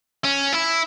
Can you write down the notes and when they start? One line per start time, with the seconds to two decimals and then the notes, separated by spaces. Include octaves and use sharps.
0.25 C#4
0.53 E4